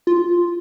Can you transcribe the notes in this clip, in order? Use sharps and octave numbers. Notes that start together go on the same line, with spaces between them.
F4